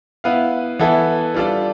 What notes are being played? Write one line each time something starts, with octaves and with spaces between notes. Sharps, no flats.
B3 E4 B4 F5
E3 B3 E4 A4
G3 D4 F4 A4 D5